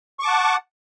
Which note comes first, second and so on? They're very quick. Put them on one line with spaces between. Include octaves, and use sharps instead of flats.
C#6 D6 A5 F#5